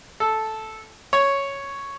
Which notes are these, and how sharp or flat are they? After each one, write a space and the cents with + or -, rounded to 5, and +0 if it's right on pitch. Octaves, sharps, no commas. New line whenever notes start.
A4 -5
C#5 +0